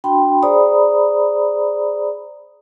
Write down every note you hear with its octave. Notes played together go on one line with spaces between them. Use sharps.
D4 F#4 G5 B5 C6
G#4 C5 D5 A#5 B5 D#6